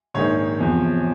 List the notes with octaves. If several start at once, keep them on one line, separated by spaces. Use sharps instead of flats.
A#1 G#2 D#3 C#5
E2 C3 F3